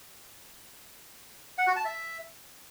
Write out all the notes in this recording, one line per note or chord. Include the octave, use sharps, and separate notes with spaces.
F#5
F#4
A5
E5